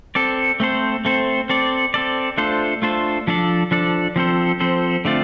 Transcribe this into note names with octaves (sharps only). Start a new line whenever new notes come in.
C4 A4 D5
A3 C4 A4 C5
A3 C4 A4 C5
C4 A4 D5
C4 A4 D5
A3 D4 F4 A4 C5
A3 D4 F4 A4 C5
F3 D4 A4 D5
F3 D4 A4 D5
F3 C4 A4 C5
F3 C4 A4 C5
D3 A3 C4 F4 D5